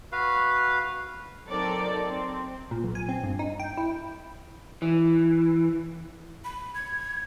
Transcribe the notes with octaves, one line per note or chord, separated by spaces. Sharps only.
F#4 B4 F5
F#3 C4 D#4 A4 A#4 D5
C4
A#2
B1
G#5
C4
G2
D#4
G5
E4
E3
B5
G#6